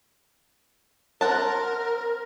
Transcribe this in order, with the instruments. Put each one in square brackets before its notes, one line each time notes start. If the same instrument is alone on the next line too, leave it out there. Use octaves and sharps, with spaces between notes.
[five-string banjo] C4 F#5 A5 [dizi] A#4